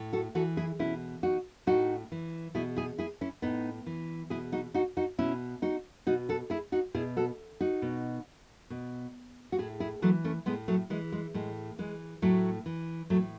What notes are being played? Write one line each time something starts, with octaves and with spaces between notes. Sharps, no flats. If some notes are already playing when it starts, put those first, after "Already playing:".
Already playing: A2
F#4 A4
E3 F#4 A4
E4 G#4
B2 C#4 E4
D#4 F#4
A2 D#4 F#4
E3
B2 E4 G#4
E4 G#4
E4 G#4
C#4 E4
A2 B3 D#4
E3
B2 E4 G#4
D#4 F#4
D#4 F#4
D#4 F#4
B2 C#4 E4
D#4 F#4
B2 D#4 F#4
F#4 A4
E4 G#4
D#4 F#4
B2 E4 G#4
F#4 A4
D#4 F#4
B2
B2
F#4
A2 E4 G#4
E4 G#4
E3 F#3 A3
A3 C#4
A2 G#3 B3
F#3 A3
E3 G#3
G#3
A2 G#3
E3 G#3
A2 F#3 A3
E3
A2 F#3 A3